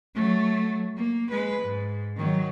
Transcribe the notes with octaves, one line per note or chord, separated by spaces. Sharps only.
F#3 A3
A#3
G#3 B4
G#2
D#3 F#3